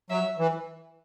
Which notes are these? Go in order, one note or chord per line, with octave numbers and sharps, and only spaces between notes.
F#3 E5
E3